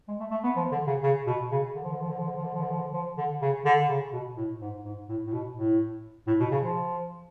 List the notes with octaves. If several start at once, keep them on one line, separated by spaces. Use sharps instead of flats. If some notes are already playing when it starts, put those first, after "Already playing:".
G#3
A3
A3
B3
F3
D3
C#3
C#3
B2
C#3
D3
F3
D3
F3
D3
F3
D3
F3
D3
F3
D3
F3
D3
F3
D3
C#3
D3
C#3
B2
A2
G#2
G#2
A2
A2
B2
A2
A2
B2
C#3
F3